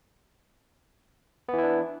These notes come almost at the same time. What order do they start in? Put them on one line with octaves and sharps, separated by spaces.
B3 E3 E4 D4